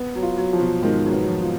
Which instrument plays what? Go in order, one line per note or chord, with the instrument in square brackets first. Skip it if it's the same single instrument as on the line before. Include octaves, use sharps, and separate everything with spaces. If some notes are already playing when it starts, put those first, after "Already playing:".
Already playing: [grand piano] B3
[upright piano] F#3
[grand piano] F4
[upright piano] F#3
[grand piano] F3
[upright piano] B2
[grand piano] G#2 [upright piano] D#3
[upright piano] F#3
[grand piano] B3
[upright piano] F#3
F3
[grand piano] F4